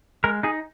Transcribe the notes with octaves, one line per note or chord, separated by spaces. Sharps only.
G#3 A#4
D#4 G#4